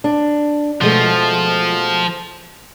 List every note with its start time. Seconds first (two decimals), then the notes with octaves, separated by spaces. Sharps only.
0.04 D4
0.81 B2 F3 G#3 A3